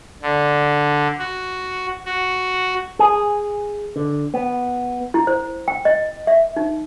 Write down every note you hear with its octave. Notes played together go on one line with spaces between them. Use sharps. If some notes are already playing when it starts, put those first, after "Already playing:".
D3
F#4
F#4
G#4
D3
B3
E4
C5
G5
D#5
E5
D#4